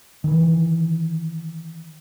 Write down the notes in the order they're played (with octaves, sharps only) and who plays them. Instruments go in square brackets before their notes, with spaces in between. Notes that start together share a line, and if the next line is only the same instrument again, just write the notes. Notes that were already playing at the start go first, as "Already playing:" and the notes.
[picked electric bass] D#3 E3